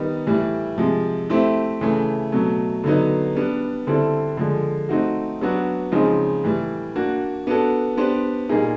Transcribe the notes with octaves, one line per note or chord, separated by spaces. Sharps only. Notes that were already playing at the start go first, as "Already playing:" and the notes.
Already playing: D#3 G3 B3 D#4
A2 E3 G3
C3 F3 G#3
A3 C4 E4 G4
C#3 E3 A3
B2 F#3 A3
D3 F#3 B3 D#4
G3 B3 D4
D3 G3 C4 E4 A4
D3 F3 G#3
A3 C4 D#4 F#4
F#3 B3 D4 F#4
C#3 F3 G#3 C4 D#4
A2 E3 G3
A#3 D4 F#4
B3 D4 F#4 A4
B3 D4 G4 C5
A#2 G3 A#3 D#4 G#4